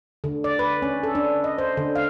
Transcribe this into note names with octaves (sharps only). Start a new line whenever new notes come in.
D3
D5
B4
C#4
A4
D4
D#5
C5
D3
F5